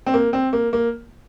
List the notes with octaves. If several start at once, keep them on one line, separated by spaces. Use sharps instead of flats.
C4
A#3
C4
A#3
A#3